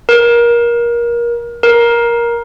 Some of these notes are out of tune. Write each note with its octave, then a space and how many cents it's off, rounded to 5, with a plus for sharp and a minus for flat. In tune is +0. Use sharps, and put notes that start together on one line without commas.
A#4 +25
A#4 +15